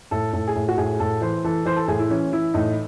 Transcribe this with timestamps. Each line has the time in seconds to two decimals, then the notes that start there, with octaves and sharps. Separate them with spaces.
0.11 A2 A4
0.33 A2 A4
0.48 G#4
0.56 A2
0.68 F#4
0.78 A2 G#4
1.00 A2 A4
1.21 E3 C5
1.44 E3 A4
1.65 E3 C5
1.76 A4
1.88 A2 G#4
1.99 E4
2.10 E3 C#4
2.32 E3 E4
2.54 A2 D#4